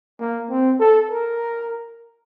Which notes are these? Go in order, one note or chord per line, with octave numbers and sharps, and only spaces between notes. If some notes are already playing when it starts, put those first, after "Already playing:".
A#3
C4
A4
A#4